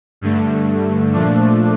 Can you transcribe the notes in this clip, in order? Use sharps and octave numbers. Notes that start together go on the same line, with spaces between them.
G2 D3 A3
A#2 F3 A3 D4